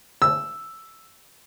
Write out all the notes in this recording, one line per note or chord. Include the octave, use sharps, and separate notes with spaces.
E6